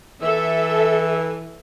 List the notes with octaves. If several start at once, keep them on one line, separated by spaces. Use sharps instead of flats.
E3 A4 E5